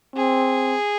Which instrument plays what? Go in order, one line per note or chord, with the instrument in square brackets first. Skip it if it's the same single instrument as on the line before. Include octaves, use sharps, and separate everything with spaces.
[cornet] C4 [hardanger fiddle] G#4